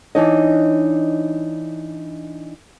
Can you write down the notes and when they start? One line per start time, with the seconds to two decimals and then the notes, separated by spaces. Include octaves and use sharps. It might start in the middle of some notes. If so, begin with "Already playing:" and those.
0.15 E3 D4 D#4 C#5 D#5